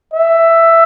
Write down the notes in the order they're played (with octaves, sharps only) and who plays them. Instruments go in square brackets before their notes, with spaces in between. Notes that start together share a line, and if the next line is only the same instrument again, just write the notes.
[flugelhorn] E5